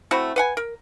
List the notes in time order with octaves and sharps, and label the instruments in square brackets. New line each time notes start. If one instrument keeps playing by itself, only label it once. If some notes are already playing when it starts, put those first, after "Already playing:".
[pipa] A3 C4 E4 F#4
B4 F#5 G#5
A#4